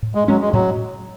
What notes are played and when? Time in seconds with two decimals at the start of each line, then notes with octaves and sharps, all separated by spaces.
0.03 A2
0.15 G#3
0.28 F#3 G#3 C#4
0.41 G#3
0.52 A2 F#3